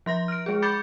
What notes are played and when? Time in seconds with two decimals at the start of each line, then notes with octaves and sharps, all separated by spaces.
0.06 F3 C6 A#6
0.28 F6 D7
0.46 G#3 G#4
0.62 B5 D6 G6 A6 C#7